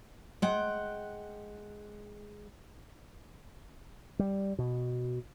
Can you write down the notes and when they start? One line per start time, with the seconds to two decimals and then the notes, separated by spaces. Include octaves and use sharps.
0.42 G#3 F#5 G5
4.19 G3
4.59 B2